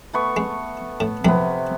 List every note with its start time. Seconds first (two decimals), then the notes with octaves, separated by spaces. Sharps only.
0.13 A3 B3 C#6
0.37 G#3
1.00 A2
1.25 A#1 F#2 C3 B3 D#6